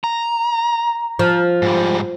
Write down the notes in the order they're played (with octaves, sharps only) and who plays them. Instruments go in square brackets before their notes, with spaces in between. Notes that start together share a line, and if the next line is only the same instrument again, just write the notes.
[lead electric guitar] A#5
[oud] F3
[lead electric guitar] G#2 G3